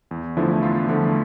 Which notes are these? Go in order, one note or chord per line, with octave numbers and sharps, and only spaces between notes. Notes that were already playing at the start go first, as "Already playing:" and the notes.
E2
D3 F3 A3 E4
E2 F4
D3 F3 A3